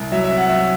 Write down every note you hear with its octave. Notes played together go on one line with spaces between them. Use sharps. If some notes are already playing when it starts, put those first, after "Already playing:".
Already playing: C2
F#3 E5
E5
C3
F#5
F#3 E5